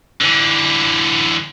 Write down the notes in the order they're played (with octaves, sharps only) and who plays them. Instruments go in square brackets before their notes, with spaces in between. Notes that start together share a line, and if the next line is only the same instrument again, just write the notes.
[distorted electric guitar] D3 E3